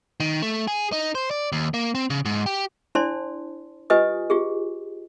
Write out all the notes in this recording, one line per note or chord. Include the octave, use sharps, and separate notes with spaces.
D#3
A3
G#4
D#4
C5
D5
D#2
A#3
C4
C#3
G#2
G4
D4 E4 C5 D5 A5 C6
F4 G4 B4 D#5 G#5 D#6
F4 G4 G#4